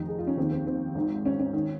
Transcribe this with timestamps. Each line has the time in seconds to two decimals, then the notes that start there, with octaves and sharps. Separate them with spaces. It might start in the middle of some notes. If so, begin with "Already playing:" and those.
Already playing: F1 F2 D#3 D#4
0.08 G#4
0.19 F4
0.27 C#4
0.37 D#2 D#3 C4
0.52 C4
0.67 C4
0.95 G#1 G#2 D#3
1.25 C#4
1.39 C#4
1.53 D#3